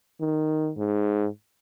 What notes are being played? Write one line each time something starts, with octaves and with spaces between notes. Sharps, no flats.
D#3
G#2